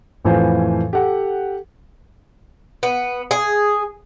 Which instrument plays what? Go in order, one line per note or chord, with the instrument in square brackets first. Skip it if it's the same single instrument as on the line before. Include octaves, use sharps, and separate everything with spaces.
[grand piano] F2 A2 E3 F4 C5 G#5
G4 A4 F#5
[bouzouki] B3
G#4